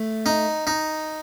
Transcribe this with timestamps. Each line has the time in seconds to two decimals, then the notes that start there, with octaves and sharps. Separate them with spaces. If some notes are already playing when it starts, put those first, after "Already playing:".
Already playing: A3
0.26 D#4
0.67 D#4